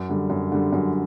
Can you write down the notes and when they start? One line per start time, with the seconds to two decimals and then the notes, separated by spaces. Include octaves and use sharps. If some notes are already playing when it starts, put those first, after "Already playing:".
Already playing: F#2
0.09 D3 G3
0.30 F#2
0.52 D3 G3
0.72 F#2